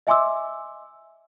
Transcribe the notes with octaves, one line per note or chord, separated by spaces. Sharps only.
D#5 E5 G#5 C6 D6 E6